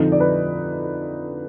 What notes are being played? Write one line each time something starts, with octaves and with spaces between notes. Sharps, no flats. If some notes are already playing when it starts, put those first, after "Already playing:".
Already playing: F2 D3 F3 D#4
D5
B4